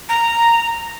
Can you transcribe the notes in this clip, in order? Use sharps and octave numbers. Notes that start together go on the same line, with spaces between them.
A#5